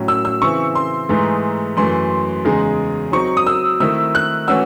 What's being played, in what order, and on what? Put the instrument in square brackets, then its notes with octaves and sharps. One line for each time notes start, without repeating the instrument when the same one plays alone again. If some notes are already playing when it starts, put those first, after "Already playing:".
Already playing: [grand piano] A2 F#3 C#4
[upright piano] E6
E6
[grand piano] C#3 E3 C4 E4 [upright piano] C#6
[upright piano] C6
[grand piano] G#2 E3 A3 D#4 G#4
[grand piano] F#2 E3 A3 [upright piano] C6
[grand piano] E2 C#3 G#3 D#4 G#4
[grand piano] F#3 C4 D#4 [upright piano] C#6
[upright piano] D#6
E6
[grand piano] D#3 A3 C4 E4 [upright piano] E6
[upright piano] F#6
[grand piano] E3 A3 C#4 F#4 [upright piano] E6